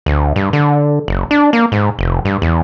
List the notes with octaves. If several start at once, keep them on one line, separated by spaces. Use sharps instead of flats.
D2
G2
D3
F#1
D4
A#3
G#2
F1
G2
E2